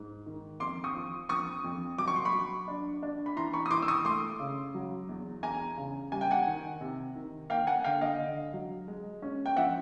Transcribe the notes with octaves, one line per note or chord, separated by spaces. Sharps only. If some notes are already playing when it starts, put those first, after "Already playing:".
Already playing: G#2
D#3
F2 C6 D6
C#6 D#6
F3
F2 C#6 D#6
F2
F#3 D6
C#6
C6
B5 C#6
F#3
D4
D4
B5
E3 A#5 C6
B5 C#6
D#6
E3 C6 D6
E6
C#6 D#6
A3 C6 D6
C#3
F#3
E2
E2 G#5 A#5
C#3
G3 G#5
G5
F#5 G#5
D#3
C3
D#3
A#3 F5 G5
F#5 G#5
D3 F5 G5
D#5 F5
D3
F#3
G#3
C#4
G5
F3 E5 F#5